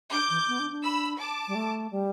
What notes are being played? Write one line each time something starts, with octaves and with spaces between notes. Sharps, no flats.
D4 D6 G6
E3
B3
D4
D4
B5 E6
A5 D6
G3
A3
G3